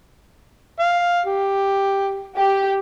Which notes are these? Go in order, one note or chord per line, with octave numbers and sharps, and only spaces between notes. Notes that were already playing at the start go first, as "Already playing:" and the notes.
F5
G4
G4